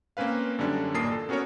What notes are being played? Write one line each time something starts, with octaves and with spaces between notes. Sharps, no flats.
A#3 C4 C#4 B4 F5
F#2 D3 G3 C#4 D4
A1 A#2 A#3 A5 D#6 C7
A4
B3 C#4 F#4 A4 A#4 C#5